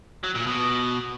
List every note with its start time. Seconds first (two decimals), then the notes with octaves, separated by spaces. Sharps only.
0.24 F#3
0.35 A#2
0.46 B2